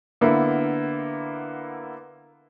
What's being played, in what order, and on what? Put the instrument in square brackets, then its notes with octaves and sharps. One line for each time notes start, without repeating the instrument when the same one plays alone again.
[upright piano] D3 A#3 B3 E4